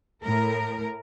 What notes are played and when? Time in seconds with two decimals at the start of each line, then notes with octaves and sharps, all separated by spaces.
0.23 A2 A#4